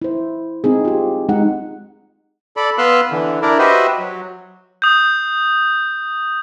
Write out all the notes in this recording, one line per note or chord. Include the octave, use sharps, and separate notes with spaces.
E4 C5
C4 D#4 G#4
F4 G4
G#3 D#4 F#5
A4 D5 B5
B3 B4 F5 C6 E6 F#6
D3 E3
D4 E4 A#4 D5
F#4 G4 B4 C5 D#5 E5
F#3
D#6 G6